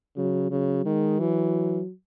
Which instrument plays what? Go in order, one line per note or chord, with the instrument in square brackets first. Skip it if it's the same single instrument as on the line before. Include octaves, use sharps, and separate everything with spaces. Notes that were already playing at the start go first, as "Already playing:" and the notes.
[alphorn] C#3 [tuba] F#3
[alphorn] C#3 [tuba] F#3
[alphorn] D#3 [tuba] G#3
[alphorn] E3 [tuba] F#3